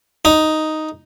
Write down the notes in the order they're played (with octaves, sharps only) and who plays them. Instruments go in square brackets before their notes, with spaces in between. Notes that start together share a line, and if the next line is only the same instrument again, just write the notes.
[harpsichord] D#4